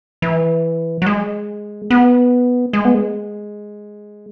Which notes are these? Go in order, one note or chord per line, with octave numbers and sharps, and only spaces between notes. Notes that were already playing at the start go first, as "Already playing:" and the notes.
E3
F#3
G#3
B3
G#3
B3
G#3